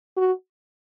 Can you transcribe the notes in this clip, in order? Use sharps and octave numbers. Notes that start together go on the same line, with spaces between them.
F#4